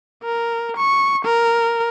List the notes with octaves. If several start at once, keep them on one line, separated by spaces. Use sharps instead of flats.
A#4
C#6
A#4